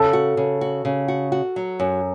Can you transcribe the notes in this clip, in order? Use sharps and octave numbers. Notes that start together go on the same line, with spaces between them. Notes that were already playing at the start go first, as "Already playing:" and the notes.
Already playing: C#3 A4
F#4
C#3
F#4
C#3
F#4
F#4
F#3
F#2